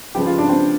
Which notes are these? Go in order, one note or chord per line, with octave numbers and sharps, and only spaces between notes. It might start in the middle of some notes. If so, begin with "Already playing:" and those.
C#3 F3 G#3 B3 G4
F4
D4
C4